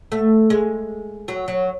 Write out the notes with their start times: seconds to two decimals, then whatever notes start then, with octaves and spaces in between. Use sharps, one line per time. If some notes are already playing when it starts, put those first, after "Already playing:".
0.12 A3
0.50 G#3
1.28 F#3
1.48 F#3